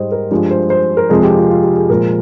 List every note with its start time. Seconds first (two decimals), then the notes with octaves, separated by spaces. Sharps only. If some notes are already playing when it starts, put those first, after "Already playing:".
Already playing: G#2 G3 C5 D#5
0.12 A#4
0.31 G2 F3 G#3 G4
0.51 C5
0.70 C5
0.97 A#4
1.10 F2 C3 F3 G#3 G#4
1.23 G4
1.36 F4
1.50 F4
1.63 G4
1.77 G#4
1.89 A#2 F3 G#3 A#4